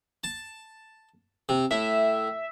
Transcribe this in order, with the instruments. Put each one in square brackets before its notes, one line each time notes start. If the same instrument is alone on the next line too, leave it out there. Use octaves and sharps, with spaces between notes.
[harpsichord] A5
C3
[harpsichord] A2 [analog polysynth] E5